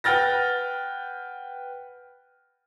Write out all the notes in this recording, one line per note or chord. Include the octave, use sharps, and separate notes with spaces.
B4 F#5 G5 F6 A6 A#6